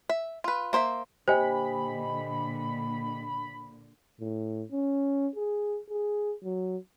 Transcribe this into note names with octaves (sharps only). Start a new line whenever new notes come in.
E5
F4 B4
A#3 C5 D5 E5
A#2 D3 G4 C5 D#5 G#5 B5
A2
C#4
G#4
G#4
F#3